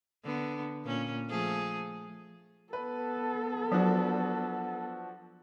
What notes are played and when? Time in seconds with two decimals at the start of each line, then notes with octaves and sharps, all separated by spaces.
0.24 D3 B3
0.84 A#2 C#4
1.28 F3 A3 G#4
2.73 B3 A4 B4
3.72 F3 F#3 D4 F#4